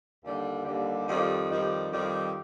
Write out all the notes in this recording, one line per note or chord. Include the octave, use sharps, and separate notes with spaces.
D#2 D3 G3
D#2 D3 G3
F2 D#3 G3
F2 D#3 G3
F2 D#3 G3